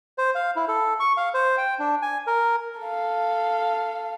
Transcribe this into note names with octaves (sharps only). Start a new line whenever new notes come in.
C5
F5
E4
A4
C#6
F5
C5
G5
D4
G#5
A#4
A4 F5